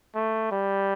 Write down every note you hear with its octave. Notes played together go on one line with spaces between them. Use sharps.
A3
G3